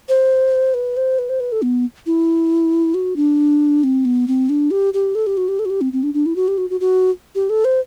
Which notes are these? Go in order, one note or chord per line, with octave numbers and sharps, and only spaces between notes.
C5
B4
C5
B4
C5
B4
A4
B3
E4
F#4
D4
C4
B3
C4
D4
G4
G4
A4
G4
F#4
G4
A4
F#4
G4
C4
C4
D4
D4
E4
F#4
G4
F#4
F#4
F#4
G4
A4
C5